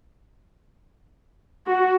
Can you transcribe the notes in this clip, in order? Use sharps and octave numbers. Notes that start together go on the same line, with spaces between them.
F#4